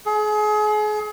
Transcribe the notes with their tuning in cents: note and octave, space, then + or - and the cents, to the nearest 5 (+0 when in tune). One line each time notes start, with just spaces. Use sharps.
G#4 +35